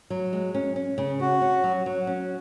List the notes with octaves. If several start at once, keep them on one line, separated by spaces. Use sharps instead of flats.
F#3
G#3
C#4
C#4
C#3
C#4 F#4
C#4
F#3
F#3
C#4